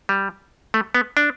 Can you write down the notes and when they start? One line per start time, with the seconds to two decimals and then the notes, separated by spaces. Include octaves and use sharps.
0.09 G3
0.74 A3
0.95 B3
1.17 D4